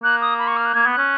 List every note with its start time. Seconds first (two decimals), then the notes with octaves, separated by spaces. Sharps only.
0.04 A#3 F#6
0.21 D#6
0.39 B5
0.47 C#6
0.57 F6
0.65 F#6
0.74 A#3 G#6
0.86 B3
0.92 F#6
0.98 C#4